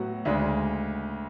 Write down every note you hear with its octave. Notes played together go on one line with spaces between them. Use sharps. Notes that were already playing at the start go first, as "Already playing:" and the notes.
Already playing: A2 F#3 B3 F#4
D2 C#3 G#3 D4